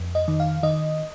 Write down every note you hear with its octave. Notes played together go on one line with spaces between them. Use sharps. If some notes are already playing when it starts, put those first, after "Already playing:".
Already playing: F2
D#5
D#3
F5
D#3 D#5